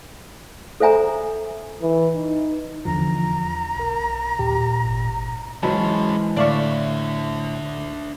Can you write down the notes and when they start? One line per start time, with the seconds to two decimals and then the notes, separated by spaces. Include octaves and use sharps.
0.80 A4 C5 E5 G#5 A#5
1.82 E3
2.15 D#4
2.85 E2 D3 F3 A#5
3.76 B1 A#4
4.39 D#2 A#2 G4
4.85 G#1
5.63 G#2 E3 F#3 G#3 C#4 A5 B5
6.37 A2 D3 D4 D5 E5 F5 C#6